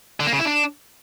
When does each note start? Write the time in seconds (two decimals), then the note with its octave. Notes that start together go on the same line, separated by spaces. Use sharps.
0.20 D3
0.26 A#3
0.33 C#3
0.39 E4
0.45 D4